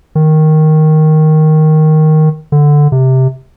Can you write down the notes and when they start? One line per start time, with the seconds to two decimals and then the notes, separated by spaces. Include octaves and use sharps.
0.15 D#3
2.52 D3
2.92 C3